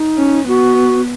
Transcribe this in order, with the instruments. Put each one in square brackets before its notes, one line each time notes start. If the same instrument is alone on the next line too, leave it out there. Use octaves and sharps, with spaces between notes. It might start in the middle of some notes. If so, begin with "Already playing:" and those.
Already playing: [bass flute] D#4
[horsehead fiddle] C#4
[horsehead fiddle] B3 [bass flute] F#4